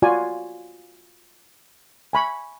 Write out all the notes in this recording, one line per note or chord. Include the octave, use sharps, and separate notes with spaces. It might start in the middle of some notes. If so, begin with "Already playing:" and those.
F4 F#4 D5 G#5
G#5 B5 C#6